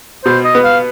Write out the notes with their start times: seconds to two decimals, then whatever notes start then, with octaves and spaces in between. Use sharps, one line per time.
0.25 B2 C5
0.45 D#5
0.55 B3
0.64 F5